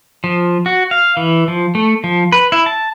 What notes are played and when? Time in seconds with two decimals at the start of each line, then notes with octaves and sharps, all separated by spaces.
0.24 F3
0.66 F#4
0.91 F5
1.17 E3
1.48 F3
1.75 A3
2.04 F3
2.32 B4
2.52 E4
2.66 A5